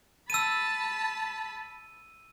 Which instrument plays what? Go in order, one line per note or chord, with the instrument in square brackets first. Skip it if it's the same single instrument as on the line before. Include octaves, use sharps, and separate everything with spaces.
[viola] A5 B5 [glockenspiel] E6 D#7